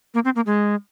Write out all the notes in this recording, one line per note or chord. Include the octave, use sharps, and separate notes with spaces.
A#3
C4
A#3
G#3